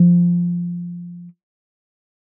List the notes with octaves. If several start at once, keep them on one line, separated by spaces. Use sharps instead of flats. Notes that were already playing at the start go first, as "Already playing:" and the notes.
Already playing: F3